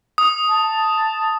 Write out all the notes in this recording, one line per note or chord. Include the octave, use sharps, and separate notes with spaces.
D#6
A5